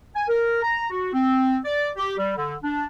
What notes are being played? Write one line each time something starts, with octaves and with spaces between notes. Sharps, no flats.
G#5
A#4
A#5
F#4
C4
D5
G4
G3
D3
D4